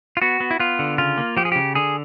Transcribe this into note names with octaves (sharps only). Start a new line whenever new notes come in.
F4
B3 F#4
B3
E4
B3 F4
D3
C#3 F4
A#3
F3 G4
G#4
C#3 G4
D3 G#4